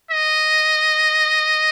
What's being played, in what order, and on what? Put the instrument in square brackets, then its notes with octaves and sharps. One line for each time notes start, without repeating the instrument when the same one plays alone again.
[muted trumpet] D#5